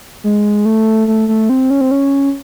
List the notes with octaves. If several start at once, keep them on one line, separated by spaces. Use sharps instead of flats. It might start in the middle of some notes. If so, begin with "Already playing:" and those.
G#3
A3
A3
A3
C4
C#4
C4
C#4